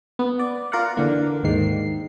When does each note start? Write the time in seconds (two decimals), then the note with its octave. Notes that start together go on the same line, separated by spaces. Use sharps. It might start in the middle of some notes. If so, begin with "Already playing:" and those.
0.19 B3
0.39 D5
0.72 F4 A#4 D5 F5 F#5
0.97 D3 E3 A#3
1.43 D#2 G#2 D#3 C7